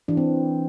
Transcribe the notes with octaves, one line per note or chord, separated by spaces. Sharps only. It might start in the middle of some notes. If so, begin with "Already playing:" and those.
E3 D4
C4